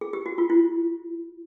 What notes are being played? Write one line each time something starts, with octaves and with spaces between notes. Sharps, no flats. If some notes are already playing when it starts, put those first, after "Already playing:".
G#4
G4
F#4
F4
E4